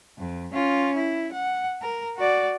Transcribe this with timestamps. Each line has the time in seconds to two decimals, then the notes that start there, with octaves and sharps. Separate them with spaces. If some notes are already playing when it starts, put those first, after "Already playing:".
0.18 F2
0.53 C#4 F4
0.95 E4
1.32 F#5
1.82 A#4
2.18 F#4 D5